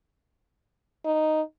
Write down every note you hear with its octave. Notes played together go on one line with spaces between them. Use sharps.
D#4